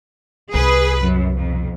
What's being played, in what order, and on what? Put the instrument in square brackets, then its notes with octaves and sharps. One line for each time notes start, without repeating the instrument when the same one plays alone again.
[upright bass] C2 [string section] G#4 B4
[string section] F#2
B1 F2